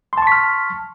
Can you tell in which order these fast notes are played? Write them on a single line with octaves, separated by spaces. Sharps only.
C6 A5 C#6 B6 F6